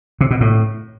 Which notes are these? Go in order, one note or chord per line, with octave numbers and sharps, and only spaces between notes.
C3
B2
A2